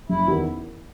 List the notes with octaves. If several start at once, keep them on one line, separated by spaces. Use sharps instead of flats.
F#1 E4
E2 D#3